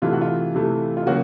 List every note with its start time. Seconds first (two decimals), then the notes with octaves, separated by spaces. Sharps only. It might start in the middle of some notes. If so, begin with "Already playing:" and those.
0.02 C3 E3 A3 F4
0.12 F#4
0.21 F4
0.54 C3 E3 A3
0.97 F4
1.07 C#3 F#3 A#3 F#4